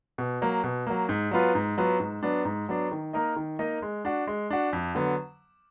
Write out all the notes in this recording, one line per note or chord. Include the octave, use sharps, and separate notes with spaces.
B2
F#3 A#3
B2
F#3 A#3
G#2
F#3 B3 F4 B4
G#2
F#3 B3 F4 B4
G#2
F#3 B3 D4
G#2
F#3 B3 D4
D#3
A#3 D#4 A#4 D#5
D#3
A#3 D#4 A#4 D#5
G#3
D4 F#4
G#3
D4 F#4
F2
D3 F#3 B3